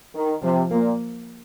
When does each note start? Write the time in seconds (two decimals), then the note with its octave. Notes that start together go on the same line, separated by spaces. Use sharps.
0.15 D#3
0.42 C3 F3
0.71 A#2 A#3